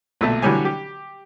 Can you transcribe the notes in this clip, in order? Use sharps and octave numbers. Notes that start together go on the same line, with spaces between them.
B1 A#2 A3 A5
D3 E3 F#3 G3 C#5 G#5
G4